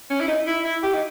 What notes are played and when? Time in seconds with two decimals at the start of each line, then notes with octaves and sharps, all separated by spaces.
0.10 C#4
0.21 E4
0.28 D#4
0.47 E4
0.65 E4
0.83 G4
0.94 D#4